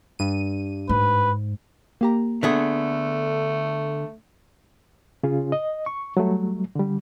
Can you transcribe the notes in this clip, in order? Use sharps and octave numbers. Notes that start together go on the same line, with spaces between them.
G2 D#7
G#2 B4
A#3 G4 A#5
D3 A3 B3 G#4
C#3 C#4 F4 G#4
D#5
C#6
F#3 G3 A3
D3 G3